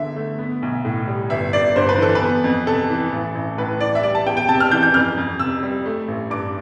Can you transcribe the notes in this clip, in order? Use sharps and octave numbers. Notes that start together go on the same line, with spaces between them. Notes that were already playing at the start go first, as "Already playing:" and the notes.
Already playing: E2 D3 E5
A3
B3
B1
A2
G3
G1 E5
G1 D5
G2 C5
B4
E3 A4
B4
B3
F2
C3 A4
E3
A1
A1
A2 B4
E3 D5
E5
G3 D5
A5
E2 G5
G5
C3 A5
F6
E3 G6
G6
F2 F6
F2
C3 E6
G3
A3
A1
G2 D6